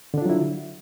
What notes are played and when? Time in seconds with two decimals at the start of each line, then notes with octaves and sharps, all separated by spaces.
0.14 D3
0.18 D4
0.22 F4
0.26 F#3
0.29 E4